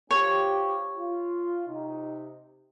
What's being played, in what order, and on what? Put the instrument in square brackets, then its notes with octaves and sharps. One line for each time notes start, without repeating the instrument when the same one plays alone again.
[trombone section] C4 F4 G4 [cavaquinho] C#5
[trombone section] F4
C3 D#4